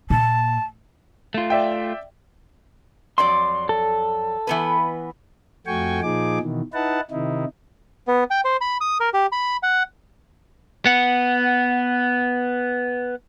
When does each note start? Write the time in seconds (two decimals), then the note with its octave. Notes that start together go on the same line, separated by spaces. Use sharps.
0.10 A#2 A5
1.34 A3 F4
1.50 D5 E5 G5
3.18 F2 F#3 D5 C6
3.69 A4
4.47 E3 B3 B4
5.67 F2 A3 F#4 G5 G#5 C#6
6.03 A#2 F3 D#4 G#4 D6
6.40 B2 D#3 E3
6.73 D#4 E4 B4 F#5 A5
7.11 C3 D#3 D#4 E4
8.07 B3
8.31 G5
8.45 C5
8.61 B5
8.81 D#6
9.00 A#4
9.13 G4
9.32 B5
9.63 F#5
10.86 B3 F#5